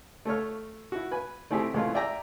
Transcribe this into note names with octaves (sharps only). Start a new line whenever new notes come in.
A3 A4 C#5 F6
E4 F#4
B4 G#5
A3 C4 E4 G4 G#4
C2 E3 G#3 A3 C#4 F4
D5 E5 G5 G#5 A#5